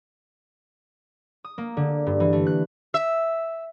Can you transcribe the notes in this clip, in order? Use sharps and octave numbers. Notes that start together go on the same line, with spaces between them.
D#6
A#3
D3
G2
E3
A3
F#6
E5